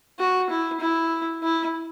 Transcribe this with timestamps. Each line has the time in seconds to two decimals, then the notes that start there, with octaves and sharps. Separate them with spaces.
0.19 F#4
0.50 E4
0.81 E4
1.43 E4